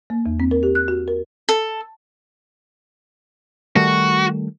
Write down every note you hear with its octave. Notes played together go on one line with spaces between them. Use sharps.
A#3
E2
C4
A#4
G4
F#6
F#4
A#4
A4
D#3 G3 A3 F#4